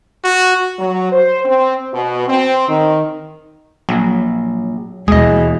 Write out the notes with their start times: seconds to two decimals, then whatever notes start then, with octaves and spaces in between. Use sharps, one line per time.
0.24 F#4
0.79 F#3
1.12 C5
1.45 C4
1.92 B2
2.28 C4
2.68 D#3
3.89 A#1 F#3
5.08 D#2 B2 E3 G#3 G#4 D#5